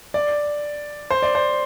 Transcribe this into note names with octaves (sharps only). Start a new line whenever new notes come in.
D5
C5
D5
C5